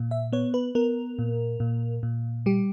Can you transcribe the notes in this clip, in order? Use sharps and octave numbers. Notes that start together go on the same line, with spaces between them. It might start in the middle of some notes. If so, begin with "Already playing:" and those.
Already playing: A#2
E5
B3 C#5
B4
B3 A#4
A#2
A#2
A#2
G3 G4